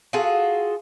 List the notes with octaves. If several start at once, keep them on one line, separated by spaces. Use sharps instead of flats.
F4 F#4 G#4 A4